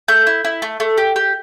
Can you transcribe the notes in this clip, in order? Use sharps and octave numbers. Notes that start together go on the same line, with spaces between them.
A3 G6
E4
E4
A3
A3
G4
G4